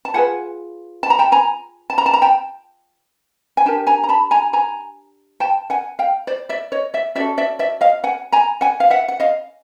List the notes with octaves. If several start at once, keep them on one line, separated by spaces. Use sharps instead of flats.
A5
F4 G#4 B4 F#5 G#5
A5
A#5
G5 A5
G#5 A#5
A5
A#5
A5
A#5
G5 A5
G#5
D4 G4 A#4 G5 A5
G#5 A#5
A#5
A5 B5
G#5 A#5
G#5 A#5
G5 A5
F#5 G#5
F5 G5
C5 D5
D5 E5
C#5 D#5
D5 E5
C#4 F#4 A4 D5 E5
D5 E5
D5 E5
D#5 F5
F#5 G#5
G#5 A#5
F#5 G#5
F5
E5 F#5
F#5
D#5 F5